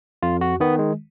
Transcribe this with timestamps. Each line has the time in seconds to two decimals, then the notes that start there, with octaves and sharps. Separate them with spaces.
0.23 F2 F4
0.41 F#4
0.60 D#3 B3
0.79 G#3